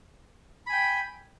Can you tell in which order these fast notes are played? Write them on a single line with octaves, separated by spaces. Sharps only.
B5 G#5 G5